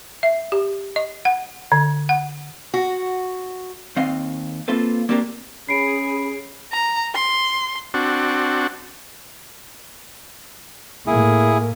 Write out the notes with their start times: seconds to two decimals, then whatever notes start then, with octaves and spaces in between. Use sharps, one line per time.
0.23 E5
0.52 G4
0.96 D#5
1.25 F#5
1.72 D3
2.09 F#5
2.74 F#4
3.96 D#2 C4 D#5 F5
4.68 A#3 C4 F4 A4 B4
5.09 A#3 C4 D4 G4 A4 A#4
5.69 C#4 G#4 B5 C7 D7
6.72 A#5
7.15 C6
7.94 C4 D4 F#4
11.07 A2 A#3 E4 G#4